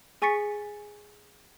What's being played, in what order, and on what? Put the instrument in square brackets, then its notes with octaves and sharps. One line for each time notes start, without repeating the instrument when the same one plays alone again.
[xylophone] G#4 G#5 C#6 A6 B6 C#7